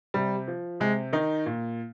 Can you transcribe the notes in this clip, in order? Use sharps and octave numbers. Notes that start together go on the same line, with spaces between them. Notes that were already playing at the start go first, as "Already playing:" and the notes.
C3 G3
F3
C3 G#3
D#3 D#4
A#2